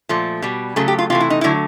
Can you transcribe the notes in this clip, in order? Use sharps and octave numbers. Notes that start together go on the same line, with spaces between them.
A#2 F3 A3
B2 G3
C#3 F#3 A3 G#4
G4
F4
C3 E3 A3 F4
E4
D#4
D3 F#3 A3 E4